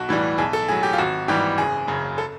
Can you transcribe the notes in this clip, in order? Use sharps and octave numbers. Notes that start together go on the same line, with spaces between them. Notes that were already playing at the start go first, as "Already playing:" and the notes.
Already playing: B1 F#4
A2 E3 G3
B1 G#4
A4
A2 F#3 G#4
G4
F4
G#1 F#4
G#2 E3 G3 G4
F#1 G#4
F#2 C#3
A4